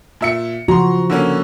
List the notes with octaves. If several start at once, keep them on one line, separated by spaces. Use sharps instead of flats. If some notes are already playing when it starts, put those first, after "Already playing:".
A#2 E5 C#7
C#3 F3 F#4 A#5 C6
D3 A#3 C#4